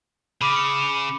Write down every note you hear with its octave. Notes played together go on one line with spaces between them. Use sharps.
C#3 B5 D6
C#7